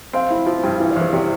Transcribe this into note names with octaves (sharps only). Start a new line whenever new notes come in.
C4 F5
E4
F3
G2
E3 E5
D5
E2 C5
C3 D5